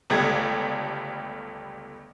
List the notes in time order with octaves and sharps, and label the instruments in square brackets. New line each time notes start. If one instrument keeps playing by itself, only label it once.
[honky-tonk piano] G1 C#2 G3 A3 G#6